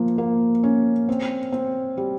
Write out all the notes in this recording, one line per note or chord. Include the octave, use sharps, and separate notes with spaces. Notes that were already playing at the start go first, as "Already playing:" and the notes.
Already playing: F3 A#3
A#3
C#4
C4
C4
G3